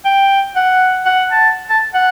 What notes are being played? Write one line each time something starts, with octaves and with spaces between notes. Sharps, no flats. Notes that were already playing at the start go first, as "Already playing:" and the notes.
G5
F#5
F#5
A5
A5
F#5